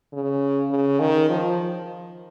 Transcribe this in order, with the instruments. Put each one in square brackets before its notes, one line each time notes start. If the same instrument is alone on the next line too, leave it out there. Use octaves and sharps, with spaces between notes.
[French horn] C#3
C#3
D#3
F3